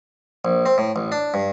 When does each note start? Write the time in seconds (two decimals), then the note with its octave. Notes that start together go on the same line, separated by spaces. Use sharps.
0.45 A#1
0.66 C4
0.78 A2
0.96 A1
1.12 D4
1.34 G2